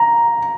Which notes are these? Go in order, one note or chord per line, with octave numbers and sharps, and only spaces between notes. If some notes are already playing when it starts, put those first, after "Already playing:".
Already playing: A#5